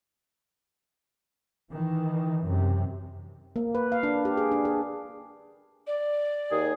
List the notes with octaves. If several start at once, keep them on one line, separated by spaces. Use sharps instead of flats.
D#3 E3
F#2 C3
A#3
B4
F5
D4
G4
G#4
D4
G#4
D5
D#2 G#4